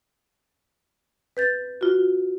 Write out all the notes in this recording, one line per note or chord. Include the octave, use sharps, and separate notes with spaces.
B4 G6 A6
F4 F#4